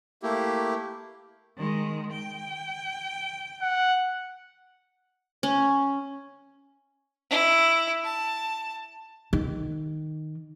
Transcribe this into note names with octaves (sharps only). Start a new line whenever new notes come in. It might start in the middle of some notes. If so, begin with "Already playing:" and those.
A3 A#3 E4 G4
D#3 G#3
G5
F#5
C#4
E4
A5
D#3